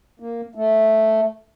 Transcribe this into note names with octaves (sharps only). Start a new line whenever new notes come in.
A#3
A3